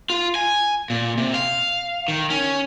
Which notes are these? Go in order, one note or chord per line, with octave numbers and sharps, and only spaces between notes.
F4
G#5
A#2
C3
F5
D#3
C#4